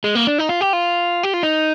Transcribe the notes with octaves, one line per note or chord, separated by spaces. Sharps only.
G#3
A#3
D4
D#4
F4
G4
F4
G4
F4
D#4